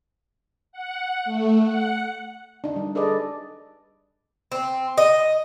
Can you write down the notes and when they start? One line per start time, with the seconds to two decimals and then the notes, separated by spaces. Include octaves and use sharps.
0.72 F#5
1.25 A3
1.61 F#5
2.64 D4 D#4
2.76 G3
2.95 D4 G#4 A4 B4 D5 D#5
4.52 C4
4.98 D#5